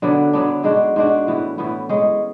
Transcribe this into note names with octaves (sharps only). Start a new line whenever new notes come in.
D3 F#3 B3 D4
D3 F#3 B3 D4
G#2 G#3 D4 F#4
G#2 G#3 D4 F#4
A2 E3 B3
A2 E3 B3
G#3 C#4 G#4